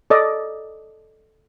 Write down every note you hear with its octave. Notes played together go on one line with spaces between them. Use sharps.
A4 D5 D#5